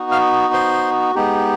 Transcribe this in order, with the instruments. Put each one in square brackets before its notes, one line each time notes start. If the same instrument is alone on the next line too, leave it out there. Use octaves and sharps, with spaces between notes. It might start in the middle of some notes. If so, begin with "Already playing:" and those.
Already playing: [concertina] B3 D#4 F#4
F5 F6
C5 C6
G#3 B3 D#4 G4